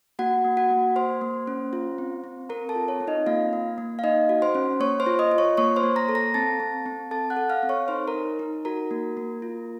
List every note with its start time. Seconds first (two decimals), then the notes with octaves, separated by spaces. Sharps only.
0.19 A#3 F#4 F#5
0.44 A#3
0.57 F#4 F#5
0.70 A#3
0.96 A#3 C5 C6
1.21 A#3
1.47 C#4
1.73 F4
1.98 C4
2.24 C4
2.49 C4 A#4 A#5
2.69 A4 A5
2.75 F4
2.88 C#5
3.01 C4
3.07 D#4 D#5
3.26 A#3 F4 F5
3.53 A#3
3.78 A#3
3.99 F5
4.04 A#3 D#4 D#5
4.29 F#4
4.42 C5 C6
4.55 C#4
4.80 A#3 C#5 C#6
5.00 C5 C6
5.06 F4
5.19 D#5 D#6
5.31 F4
5.38 C#5 C#6
5.57 A#3 C#5 C#6
5.76 C5 C6
5.83 A#3
5.96 A#5 A#6
6.09 A4
6.15 A#5 A#6
6.34 C4 A5 A6
6.60 C4
6.86 C4
7.11 A4 A5 A6
7.30 F#5 F#6
7.37 A4
7.50 F5 F6
7.63 C4
7.69 C#5 C#6
7.88 D#4 C5 C6
8.08 A#4 A#5
8.14 D#4
8.39 D#4
8.65 F#4 A#4 A#5
8.91 A#3
9.17 A#3
9.42 F4